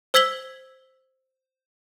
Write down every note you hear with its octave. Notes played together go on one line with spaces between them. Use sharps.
C5 E6 G#6 B6 F#7 G7